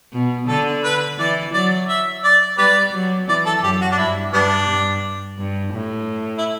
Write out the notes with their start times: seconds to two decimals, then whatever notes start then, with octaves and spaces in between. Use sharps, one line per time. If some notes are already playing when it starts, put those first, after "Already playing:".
0.13 B2
0.48 D3 A4
0.84 B4
1.19 E3 D5
1.54 F#3 D5
1.89 E5
2.24 D5
2.58 G3 G4 B4 D5
2.93 F#3
3.28 E3 D5
3.46 A4
3.63 F#2 G4
3.81 F#4
3.92 D4
3.98 G2 E4
4.33 G2 G3 B3 D4
4.68 G2
5.39 G2
5.73 A2
6.38 E4